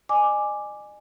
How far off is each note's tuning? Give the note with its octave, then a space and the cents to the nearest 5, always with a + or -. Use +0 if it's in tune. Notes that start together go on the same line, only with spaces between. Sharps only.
D#5 -40 G#5 +0 D6 +0